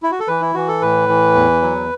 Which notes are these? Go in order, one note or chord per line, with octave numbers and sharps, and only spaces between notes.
E4
F#4
A4
E3 B4
E4
E3 F#4
A4
A2 B4
E3
E2
F#3